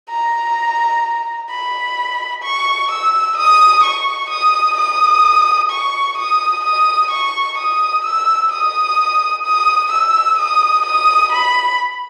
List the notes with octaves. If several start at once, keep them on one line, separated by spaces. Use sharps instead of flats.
A#5
B5
C#6
E6
D#6
C#6
D#6
D#6
C#6
D#6
D#6
C#6
D#6
E6
D#6
D#6
E6
D#6
D#6
B5